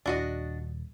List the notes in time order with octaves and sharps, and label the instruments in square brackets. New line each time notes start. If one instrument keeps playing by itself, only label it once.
[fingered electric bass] D#1 [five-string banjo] D4 F#4 D#5